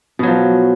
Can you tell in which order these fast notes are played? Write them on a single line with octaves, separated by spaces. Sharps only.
B2 F#3 F3